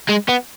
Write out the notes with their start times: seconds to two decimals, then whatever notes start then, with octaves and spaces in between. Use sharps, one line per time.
0.09 G#3
0.29 B3